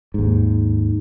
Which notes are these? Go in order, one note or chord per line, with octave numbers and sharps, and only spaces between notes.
D#2 G#2